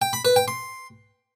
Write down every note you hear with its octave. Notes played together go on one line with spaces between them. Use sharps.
G5
B5
B4
G5
C6